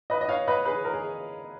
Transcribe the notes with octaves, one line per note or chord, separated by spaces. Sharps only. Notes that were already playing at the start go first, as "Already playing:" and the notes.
B4 D#5
D#5
C#5 F5
B4 D#5
G#4 B4
A#4
G#4